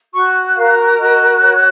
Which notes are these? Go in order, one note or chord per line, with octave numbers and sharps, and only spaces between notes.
F#4 C#6
A#4 F5
F#4 D#5
C#5